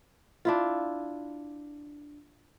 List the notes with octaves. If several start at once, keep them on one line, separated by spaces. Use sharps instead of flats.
D4 E4 F4